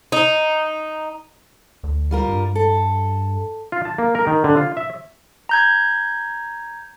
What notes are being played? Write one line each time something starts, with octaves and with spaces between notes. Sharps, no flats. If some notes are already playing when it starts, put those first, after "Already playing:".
D#4
D2
G3 F4 A#4
G2
A4
F4
A5
A#3
A#4
D#3
D3
F4
E5
A#5 G6 G#6